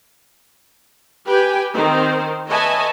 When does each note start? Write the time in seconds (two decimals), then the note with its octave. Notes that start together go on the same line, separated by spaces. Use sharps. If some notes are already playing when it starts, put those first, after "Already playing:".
1.24 G4 B4 G5 G#5
1.74 D#3 C4 D#4 C5
2.47 B4 C#5 D#5 E5 G#5 A5